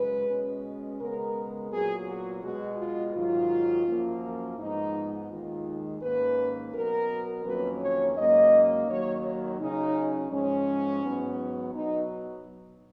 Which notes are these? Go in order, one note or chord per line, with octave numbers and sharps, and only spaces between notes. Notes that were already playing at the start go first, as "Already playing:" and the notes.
Already playing: F#2 C#3 G#3 B4
B2 G#3 C#4
C#3 G#3 B3 A#4
A#2 F#3 B3 G#4
F#4
B2 G#3 B3 F#4
F4
G#2 D#3 F#3 F4
F#2 F3 A#3
G#2 F3 G#3 B3 D#4
D#2 D#3 G#3 F4
G#2 D#3 A#3 C#4 B4
B2 F#3 B3 A#4
F2 D#3 F#3 A#3 C#4 B4
C#5
G#2 F#3 A#3 C#4 D#5
D#2 D#3 F#3 A#3 C#5
C#3 F#3 C#4 D#4
G#2 F3 G#3 C#4
G#2 F#3 B3
B2 F#3 B3 D#4